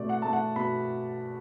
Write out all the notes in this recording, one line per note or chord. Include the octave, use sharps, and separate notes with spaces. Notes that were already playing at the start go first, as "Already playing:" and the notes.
Already playing: B2 A3 D5
F#5
A3 A5
F#5
B2 B5